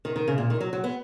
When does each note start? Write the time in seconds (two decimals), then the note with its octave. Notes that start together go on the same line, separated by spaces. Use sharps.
0.05 D#3
0.16 D#3
0.28 C#3
0.38 A#2
0.50 D#3
0.60 F#3
0.73 F#3
0.84 B3